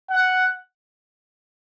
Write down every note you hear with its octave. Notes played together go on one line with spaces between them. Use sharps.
F#5